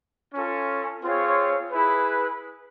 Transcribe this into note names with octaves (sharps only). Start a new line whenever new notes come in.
C#4 F4 A4
C4 F4 G#4 C#5 F5
E4 G#4 B4